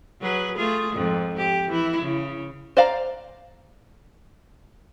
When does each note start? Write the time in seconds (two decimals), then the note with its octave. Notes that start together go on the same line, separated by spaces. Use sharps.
0.22 F#3 G#4 B4
0.56 A3 F4 G#4
0.93 F2 G#2
1.37 G4
1.67 E3 E4
2.02 C#3
2.77 C5 D5 F5 A#5